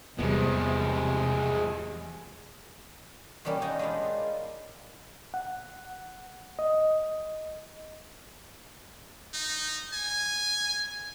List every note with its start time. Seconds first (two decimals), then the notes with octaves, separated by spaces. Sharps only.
0.19 E2 C3 F3 G3 G#3 B3
3.45 B2 E3 G3 A#3 C#4
3.62 D#4 F#4 C#5 G5 G#5 A#5
3.79 G#3 D4 E4 F4
5.34 F#5
6.59 D#5
9.34 D#4
9.93 G#5